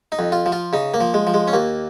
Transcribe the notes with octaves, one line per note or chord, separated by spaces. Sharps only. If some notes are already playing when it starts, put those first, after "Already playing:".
D#4
F2
F4
F3
F4
C#3 D#4
A#3
F3
G#3
F3
G#3
C#4
D#2 A#3